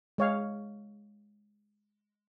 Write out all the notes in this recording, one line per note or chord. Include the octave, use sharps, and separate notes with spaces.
G#3 C#5 F5